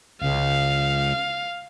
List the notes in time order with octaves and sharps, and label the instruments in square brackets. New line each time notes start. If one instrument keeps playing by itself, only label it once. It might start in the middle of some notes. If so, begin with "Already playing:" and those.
[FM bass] C#2 [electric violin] F5